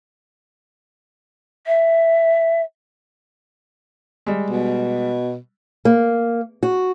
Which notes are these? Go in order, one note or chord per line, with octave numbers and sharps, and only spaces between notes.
E5
G3 G#3
B2
A#3
F#4